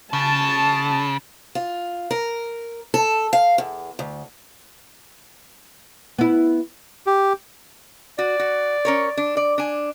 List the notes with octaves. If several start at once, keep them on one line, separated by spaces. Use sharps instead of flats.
C#3 A5
F4
A#4
A4
F5
E2
D2
B3 E4
G4
F#4 D5
F#4
C#4 A#4 C#5
D4
D5
D4 G#5